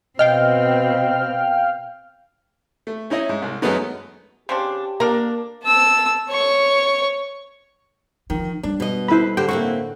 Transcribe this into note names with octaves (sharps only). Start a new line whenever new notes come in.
B2 C4 D#5 F5 G5 F6
A3
C#4 D#4 E4 D#5
G#2
C2
F#2 F#3 G#3 A3 B3 D#4
C#3 C4 D4 G4
A#3 D4 A#4 A#5
A5 E6
C#5 C#6
D3 D#3 F3
G3 D4
B2 D#5
E4 A4 B4 C5 B5
A2 D3 G4 C5 G5
A#3 C4 E4 F#4 C#6